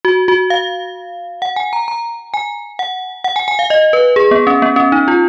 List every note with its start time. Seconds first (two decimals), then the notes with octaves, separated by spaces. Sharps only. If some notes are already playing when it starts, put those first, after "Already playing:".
0.05 F#4
0.28 F#4
0.50 F5
1.42 F#5
1.56 G#5
1.73 A#5
1.88 A#5
2.34 G#5
2.79 F#5
3.24 F#5
3.36 G#5
3.48 G#5
3.59 F5
3.70 D#5
3.93 B4
4.16 G#4
4.31 B3
4.47 C#4
4.62 B3
4.76 C#4
4.92 D#4
5.08 F4